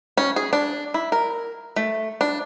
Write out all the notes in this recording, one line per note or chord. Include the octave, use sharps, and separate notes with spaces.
C#4
G#4
D4
E4
A#4
A3
D4